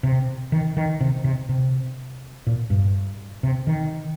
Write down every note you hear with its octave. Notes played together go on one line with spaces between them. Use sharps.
C3
D#3
D#3
C3
C3
C3
A#2
G2
C3
D#3